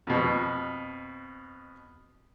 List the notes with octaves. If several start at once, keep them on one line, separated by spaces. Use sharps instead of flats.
F2 B2